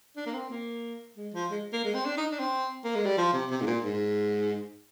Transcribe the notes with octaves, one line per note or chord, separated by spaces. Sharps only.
D4
A#3
C4
A#3
G#3
F3
G#3
A#3
G#3
C4
D4
D#4
D4
C4
A#3
G#3
G3
F3
C3
C3
G#2
A#2
G#2